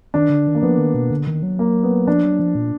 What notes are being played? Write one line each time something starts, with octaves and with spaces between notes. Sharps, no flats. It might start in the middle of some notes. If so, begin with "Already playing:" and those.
D#3 D4
D3
D#3
A#3
F3 B3
D#3
B2
D3
D#3
F#3
A#3
B3
F3 D4
F#3
F3
A#2